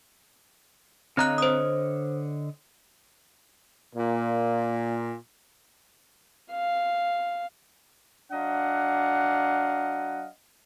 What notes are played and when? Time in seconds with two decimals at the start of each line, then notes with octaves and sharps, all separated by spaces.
1.17 D3 C4 C#5 D#5 A#5 F#6
1.38 C5 D#6
3.95 A#2
6.52 F5
8.32 F#3 D4 D#5 F5 F#5